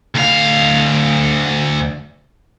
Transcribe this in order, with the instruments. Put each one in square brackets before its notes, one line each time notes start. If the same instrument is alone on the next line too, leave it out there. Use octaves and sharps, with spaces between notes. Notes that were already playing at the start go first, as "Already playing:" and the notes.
[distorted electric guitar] D2 F5